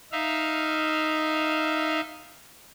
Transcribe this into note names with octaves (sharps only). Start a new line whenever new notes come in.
D#4 E5 F5